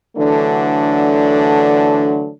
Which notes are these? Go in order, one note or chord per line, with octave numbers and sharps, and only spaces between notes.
D3 E3 F#3 A3 D4